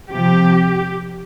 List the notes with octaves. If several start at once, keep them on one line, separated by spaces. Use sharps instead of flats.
C3 F3 G4